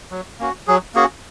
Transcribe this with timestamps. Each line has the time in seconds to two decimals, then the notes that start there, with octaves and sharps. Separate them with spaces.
0.11 F#3
0.39 A#3 C#4 F#4
0.67 F#3 G#4
0.95 A#3 C#4 F#4 G#4